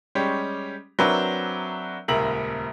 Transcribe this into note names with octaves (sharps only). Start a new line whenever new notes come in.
G3 G#3 C#4 G4
F#3 C4 D4 A#4 B4 E5
D#1 C#2 A#3 E5 A#5 F#7